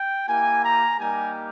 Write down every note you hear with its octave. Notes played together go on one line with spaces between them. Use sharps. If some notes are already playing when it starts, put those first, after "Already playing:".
Already playing: G5
A#3 E4 G4 G#5
A#5
G3 A#3 D#4 G4 G#5